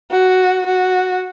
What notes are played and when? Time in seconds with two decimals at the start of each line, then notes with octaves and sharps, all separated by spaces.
0.12 F#4
0.66 F#4